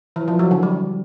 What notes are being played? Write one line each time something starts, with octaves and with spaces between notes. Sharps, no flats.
E3
F3
F#3
D3
G3